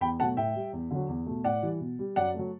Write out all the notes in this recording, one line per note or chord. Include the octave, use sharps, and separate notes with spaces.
E2 G5 B5
B2 F#3 A3 F#5 A5
A2 E5 G5
G3
E2
D3 F#3
E2
B2 A3
A2 D5 F#5
E3 G3
B2
G3
F#2 D5 F#5
F#3 A3